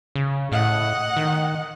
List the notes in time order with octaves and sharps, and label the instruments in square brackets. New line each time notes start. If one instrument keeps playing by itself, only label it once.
[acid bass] C#3
[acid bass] A2 [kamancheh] D#5 F#5
[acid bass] D#3